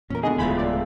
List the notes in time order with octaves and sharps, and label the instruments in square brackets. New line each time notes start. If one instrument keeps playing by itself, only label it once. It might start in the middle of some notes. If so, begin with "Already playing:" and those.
[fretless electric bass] E2 A#2 [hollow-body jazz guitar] C#4 A#4
[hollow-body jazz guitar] C#2 B2 D3 [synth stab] D4 F#4 D#5 [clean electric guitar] G#4
[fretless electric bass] D1 E2 [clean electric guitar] G#3 A3 F4 [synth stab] E4 B5
[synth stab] D5